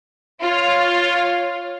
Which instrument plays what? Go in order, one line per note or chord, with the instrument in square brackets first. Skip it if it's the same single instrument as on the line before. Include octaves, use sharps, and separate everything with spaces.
[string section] F4 C#5